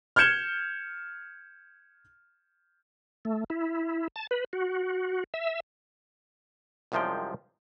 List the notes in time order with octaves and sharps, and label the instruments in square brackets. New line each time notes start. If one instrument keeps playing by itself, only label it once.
[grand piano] F6 G6 G#6 C#7 E7 G7
[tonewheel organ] A3
E4
A5
B4
F#4
E5
[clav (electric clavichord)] C2 F#2 C3 F3 G#3 G5